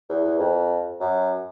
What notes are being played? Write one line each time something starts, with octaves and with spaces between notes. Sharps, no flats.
E2
E2
F2
F#2